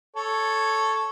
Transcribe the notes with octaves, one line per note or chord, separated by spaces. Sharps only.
A4 C#5